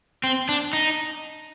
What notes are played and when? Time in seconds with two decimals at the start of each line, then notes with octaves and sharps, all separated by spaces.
0.24 C4
0.49 D4
0.73 D#4